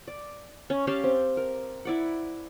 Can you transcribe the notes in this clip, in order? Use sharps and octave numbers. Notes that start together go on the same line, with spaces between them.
D5
C#4
C#4 G4 F5 A5
C4
A#4
E4 D5 F#5